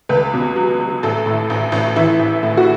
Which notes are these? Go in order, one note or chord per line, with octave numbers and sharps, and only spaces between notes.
C#2 B4
B2
F#3
F#3
A1 A4
A2
A1
A1
E3 E4
A1
A2
F#4